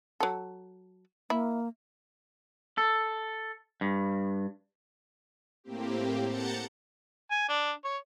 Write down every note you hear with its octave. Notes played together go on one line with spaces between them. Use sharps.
F#3 A4
A#3 E4
A4
G2
A2 A#3 C4 G4
F#5 A5 A#5 G6 A6 C#7
G#5
D4
C#5